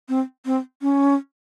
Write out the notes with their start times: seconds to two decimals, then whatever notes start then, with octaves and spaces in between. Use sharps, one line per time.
0.09 C4
0.46 C4
0.82 C#4